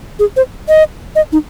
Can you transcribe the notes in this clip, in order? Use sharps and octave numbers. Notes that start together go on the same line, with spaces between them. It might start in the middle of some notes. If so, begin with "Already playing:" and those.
G#4
C5
D#5
D#5
D#4